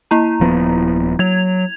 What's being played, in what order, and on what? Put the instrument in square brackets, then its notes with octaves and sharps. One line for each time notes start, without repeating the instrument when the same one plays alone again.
[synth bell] A#3 E4 A#5
[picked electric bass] D#1 F3 B3
[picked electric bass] F#3 [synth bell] G#6 F7